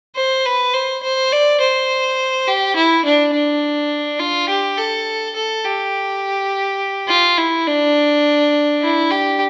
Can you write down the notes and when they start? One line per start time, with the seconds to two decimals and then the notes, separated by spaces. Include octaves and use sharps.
0.16 C5
0.45 B4
0.73 C5
1.03 C5
1.32 D5
1.61 C5
2.47 G4
2.76 E4
3.05 D4
3.33 D4
4.19 F4
4.49 G4
4.78 A4
5.36 A4
5.65 G4
7.08 F4
7.38 E4
7.67 D4
8.82 E4
9.11 G4